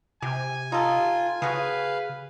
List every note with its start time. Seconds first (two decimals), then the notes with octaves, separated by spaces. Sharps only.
0.22 C3 G4 G#5
0.72 D#4 F4 A4
1.42 C#3 F#4 G#4 B4 F5